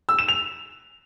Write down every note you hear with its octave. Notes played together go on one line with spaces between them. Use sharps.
E6
E7
F7